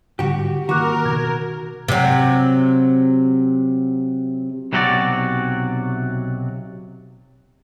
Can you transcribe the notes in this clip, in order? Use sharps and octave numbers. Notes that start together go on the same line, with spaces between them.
G#2 D3 G3 F#4 G4
D#3 A#3 F#4 A#4 C#6 D6 F#6
B2 D#3 G#6
C3 F#3
B1 C3 F#3 E4 F#4 D5